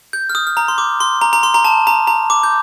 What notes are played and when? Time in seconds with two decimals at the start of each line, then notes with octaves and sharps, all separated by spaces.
0.13 G6
0.30 F6
0.35 D#6
0.47 F6
0.57 A#5
0.68 C6
0.78 D6
1.00 C6
1.21 A#5
1.33 A#5
1.43 C6
1.54 A#5
1.65 A5
1.87 A#5
2.07 A#5
2.30 D6
2.43 G6